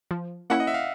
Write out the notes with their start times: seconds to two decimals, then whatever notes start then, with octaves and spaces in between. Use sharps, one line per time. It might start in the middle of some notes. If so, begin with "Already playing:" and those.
0.11 F3
0.50 A#3 C#4 E4 F#5
0.60 D#5
0.67 E5
0.74 F5